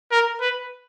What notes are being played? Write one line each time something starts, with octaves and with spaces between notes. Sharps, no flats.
A#4
B4